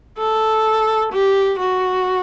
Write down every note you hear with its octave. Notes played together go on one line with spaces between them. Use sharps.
A4
G4
F#4